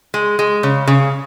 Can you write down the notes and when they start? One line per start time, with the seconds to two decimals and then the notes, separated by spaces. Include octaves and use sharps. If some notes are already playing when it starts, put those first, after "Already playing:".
0.14 G#3
0.39 G#3
0.63 C#3
0.87 C#3